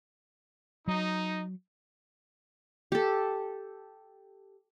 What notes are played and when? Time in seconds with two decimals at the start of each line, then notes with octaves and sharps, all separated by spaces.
0.88 F#3 D#4
2.92 G4 A4